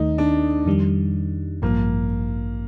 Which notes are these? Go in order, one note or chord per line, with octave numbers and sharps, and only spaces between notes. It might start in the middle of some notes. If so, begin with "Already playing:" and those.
Already playing: D#2 D#3 A3 D#4
D4
F2 D#3 G3
A1 G2 F3 A#3